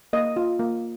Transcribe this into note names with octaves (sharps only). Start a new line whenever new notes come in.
A#3 D#5
F4
A#3